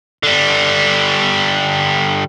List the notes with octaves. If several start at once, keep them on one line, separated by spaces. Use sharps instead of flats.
D3 G3